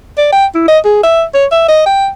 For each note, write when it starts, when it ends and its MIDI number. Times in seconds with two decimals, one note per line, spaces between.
0.18 0.32 74
0.32 0.46 79
0.55 0.66 64
0.68 0.78 75
0.85 1.02 68
1.03 1.24 76
1.34 1.46 73
1.52 1.64 76
1.68 1.83 75
1.86 2.09 79